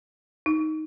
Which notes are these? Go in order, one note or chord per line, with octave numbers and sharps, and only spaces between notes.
D#4